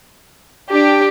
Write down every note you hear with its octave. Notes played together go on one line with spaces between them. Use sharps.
D4 G4